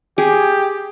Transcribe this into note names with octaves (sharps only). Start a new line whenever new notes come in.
G4 G#4